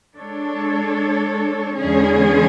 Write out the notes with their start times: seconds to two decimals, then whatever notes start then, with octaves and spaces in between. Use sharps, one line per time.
0.15 G#3 D4 A4 C#5
1.77 E2 D3 G#3 C#4 G#4